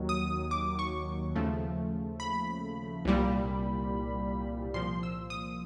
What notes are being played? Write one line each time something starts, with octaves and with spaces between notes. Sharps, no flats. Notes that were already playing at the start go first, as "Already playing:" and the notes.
Already playing: D#2 D#3 F#3
D#6
D6
C#6
D#2 C#3 F3 A3
B5
C2 A#2 G3
C2 A#2 F3 C6
E6
D#6